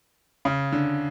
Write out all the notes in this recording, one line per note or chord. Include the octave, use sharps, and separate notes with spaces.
C#3
D3